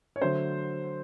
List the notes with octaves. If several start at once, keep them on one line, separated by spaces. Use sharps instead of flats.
C#5
D3 F#3 A3 C5